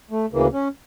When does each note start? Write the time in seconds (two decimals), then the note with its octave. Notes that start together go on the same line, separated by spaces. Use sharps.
0.11 A3
0.32 D2 C#3 E3 A#3
0.53 C#4